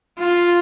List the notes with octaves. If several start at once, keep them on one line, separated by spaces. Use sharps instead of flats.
F4